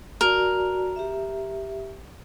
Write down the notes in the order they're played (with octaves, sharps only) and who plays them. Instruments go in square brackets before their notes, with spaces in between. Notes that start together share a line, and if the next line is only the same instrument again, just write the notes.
[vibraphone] F#4 D5 A5 [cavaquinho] A#4
[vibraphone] G4 E5